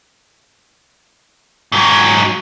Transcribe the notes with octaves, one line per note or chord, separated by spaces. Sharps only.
G#2 F#3